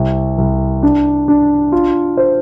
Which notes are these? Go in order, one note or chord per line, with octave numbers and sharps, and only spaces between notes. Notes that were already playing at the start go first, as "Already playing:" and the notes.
Already playing: C2
C2
D4
D4
F4
C5